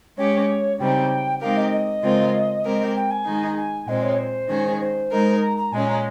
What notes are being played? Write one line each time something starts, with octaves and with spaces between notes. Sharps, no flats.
G#3 C#4 G4 C#5
C#3 G3 C4 D#4 G5
G#3 C4 D#4 G4 A#4 F5
D#5
D#5
C#3 G#3 C4 F4 A#4
G#3 C4 G4 A#4
G5
G#5
D#3 G#3 D#4 G#4
G#5
A#2 G#3 C4 D#5
C#5
C5
D#3 G#3 C#4 G#4
C5
G#3 D#4 A#4
A#5
A#5
A#2 G#3 C#4 G#5
A#5